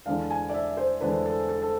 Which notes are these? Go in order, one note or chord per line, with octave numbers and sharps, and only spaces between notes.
E2 D3 G#3 D4 F5
G#5
D5
E5
C5
E2 D3 G#3 D4 B4
A4
A4
A4